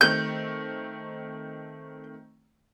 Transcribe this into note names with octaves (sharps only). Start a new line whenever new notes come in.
D#3 A3 C4 G6